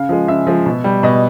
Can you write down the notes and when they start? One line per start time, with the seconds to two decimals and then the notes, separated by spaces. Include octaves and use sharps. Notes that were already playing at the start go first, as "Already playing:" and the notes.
Already playing: C#3 F5
0.09 F3 G#3
0.28 C#3 E5
0.47 F3 G#3
0.66 B2
0.84 G3
1.03 B2 D#5